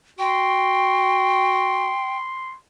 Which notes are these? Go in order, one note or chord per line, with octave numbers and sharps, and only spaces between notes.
F#4 G5 C6